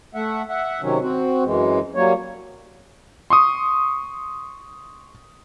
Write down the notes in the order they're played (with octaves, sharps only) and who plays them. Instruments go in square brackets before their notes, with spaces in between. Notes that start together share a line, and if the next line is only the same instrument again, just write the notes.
[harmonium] A3 E5 F#5
E5 F#5
C3 D#3 F#3 C#4
C4 F#4
F#2 E3 G#3
F#3 G3 A#3 C#5
[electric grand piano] C6 C#6 D#6